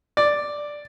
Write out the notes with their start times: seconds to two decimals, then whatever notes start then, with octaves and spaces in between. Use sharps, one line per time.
0.17 D5